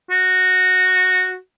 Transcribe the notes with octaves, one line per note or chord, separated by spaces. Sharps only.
F#4